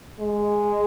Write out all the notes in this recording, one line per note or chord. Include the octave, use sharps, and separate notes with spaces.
G#3